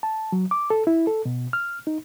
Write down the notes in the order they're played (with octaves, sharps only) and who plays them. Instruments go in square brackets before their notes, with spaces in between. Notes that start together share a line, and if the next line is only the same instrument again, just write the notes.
[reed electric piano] A5
F#3
D6
A4
E4
A4
B2
F6
D#4